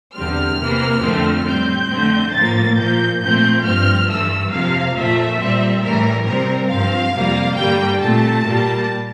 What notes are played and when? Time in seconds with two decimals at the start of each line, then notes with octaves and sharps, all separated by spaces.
0.14 E2 D3 G3 C4 F6
0.58 C3 E3 A#3
1.02 F2 D3 A3 C4
1.45 A2 G3 C4 G6
1.89 F2 D3 A3 C4
2.33 A2 F3 A#3 A6
2.77 A#2 F3 A#3 G6
3.20 A#2 F3 A3 C4 G6
3.63 G2 F3 C4 F6
4.08 G2 E3 A3 E6
4.51 F2 C3 F3 A#3 F5
4.95 A#2 F3 A3 E5
5.38 A#2 G3 C4
5.82 A2 E3 G3 A#4
6.25 C3 G3 C4 A#4
6.69 G2 F3 C4 F5
7.13 F2 C3 G3 A#3
7.56 G2 D3 G3 A#3 G5
8.00 A#2 A3 C4 A5
8.44 A#2 G3 A#3